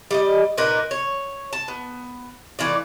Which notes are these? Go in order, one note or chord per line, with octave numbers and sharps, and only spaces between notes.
G3 D5 D#5
A#2 D#4 A#4 B4
C#5
A5
B3
A2 E3 F4 D5